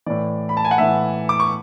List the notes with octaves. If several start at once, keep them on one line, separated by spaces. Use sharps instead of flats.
A2 E3 D5
B5
A5
G#5
F#5
A2 E3 E5
D6
C#6